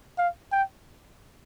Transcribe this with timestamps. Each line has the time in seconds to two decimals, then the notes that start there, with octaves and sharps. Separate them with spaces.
0.18 F5
0.52 G5